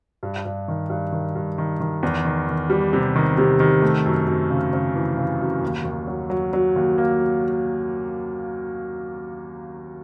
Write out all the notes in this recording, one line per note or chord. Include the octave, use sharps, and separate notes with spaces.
G2
G2
D#3
G2
D#3
G2
D#3
D#3
E2
D#3
D#3
G3
C3
D#3
C3
D#3
A3
F#2
F#2
C#3
C#3
E3
C#3
F#2
D#2
D#2
F#3
F#3
F#3
D#2
A#3